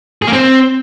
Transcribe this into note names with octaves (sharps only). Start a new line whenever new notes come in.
G#4
A#3
C4